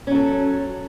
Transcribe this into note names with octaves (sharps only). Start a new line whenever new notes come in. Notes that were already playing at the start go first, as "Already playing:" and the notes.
F#3 C#4 A4